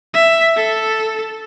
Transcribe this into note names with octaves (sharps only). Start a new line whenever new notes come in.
E5
A4